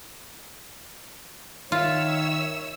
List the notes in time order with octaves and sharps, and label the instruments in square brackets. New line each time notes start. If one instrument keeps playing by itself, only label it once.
[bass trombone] D#3 [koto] F4 [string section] C#5 E5 E6